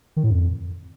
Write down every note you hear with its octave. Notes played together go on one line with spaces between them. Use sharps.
D#3
A2
F2